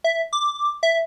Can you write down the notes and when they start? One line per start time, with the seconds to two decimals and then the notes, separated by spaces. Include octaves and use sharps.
0.04 E5
0.33 D6
0.83 E5